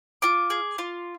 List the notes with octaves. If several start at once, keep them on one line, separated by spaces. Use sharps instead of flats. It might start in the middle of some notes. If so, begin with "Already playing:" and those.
F4 D6
G#4
F4